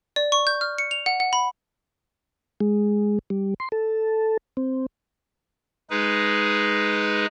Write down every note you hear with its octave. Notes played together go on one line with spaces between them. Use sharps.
D5
C#6
G6
F6
C#7
F7
F#5
F#5
B5
G#3
G3
C6
A4
C4
G#3 D#4 G#4 B4